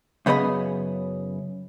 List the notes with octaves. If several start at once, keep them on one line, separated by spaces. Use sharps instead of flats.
F#2 C#3 B3 G#4 D#5 B5